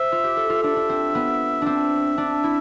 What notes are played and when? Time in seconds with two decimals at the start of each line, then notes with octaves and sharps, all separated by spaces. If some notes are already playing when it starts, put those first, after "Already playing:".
Already playing: C5 E5
0.12 F4
0.24 G4
0.37 A4
0.50 F4
0.63 D4 E5
0.76 D4
0.89 C4
1.15 B3
1.62 C4 D4 E5
2.18 D4
2.44 E4